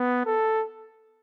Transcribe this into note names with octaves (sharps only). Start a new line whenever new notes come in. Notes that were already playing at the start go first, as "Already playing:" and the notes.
Already playing: B3
A4